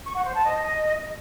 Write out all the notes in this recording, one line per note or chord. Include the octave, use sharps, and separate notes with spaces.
C#6
F#5
C5
A5
D#5